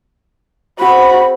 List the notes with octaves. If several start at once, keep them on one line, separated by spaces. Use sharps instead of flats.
C4 F#4 G#4 C5 B5